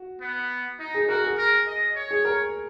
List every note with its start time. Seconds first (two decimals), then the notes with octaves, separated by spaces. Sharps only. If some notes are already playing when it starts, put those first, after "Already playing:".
Already playing: F#4
0.21 B3
0.79 D#4
0.94 G#4
1.09 F#4 A#4
1.24 G#4
1.37 A#4
1.67 D#5
1.96 C#5
2.11 G#4
2.25 A#4